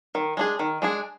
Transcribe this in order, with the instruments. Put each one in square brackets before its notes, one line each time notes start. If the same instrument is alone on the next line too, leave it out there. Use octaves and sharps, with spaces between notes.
[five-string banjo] D#3
G#3 D4 G#4
D#3
G#3 D4 G#4